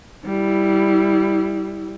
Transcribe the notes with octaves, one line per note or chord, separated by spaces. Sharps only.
G3 E4